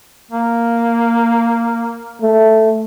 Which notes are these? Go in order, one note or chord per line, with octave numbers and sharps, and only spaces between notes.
A#3
A3